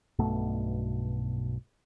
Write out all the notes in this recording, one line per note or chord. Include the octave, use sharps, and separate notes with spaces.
B1 G2 B2 A3